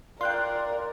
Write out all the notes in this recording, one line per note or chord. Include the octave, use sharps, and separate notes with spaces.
F4 A#4 D5 G5 C6 F#6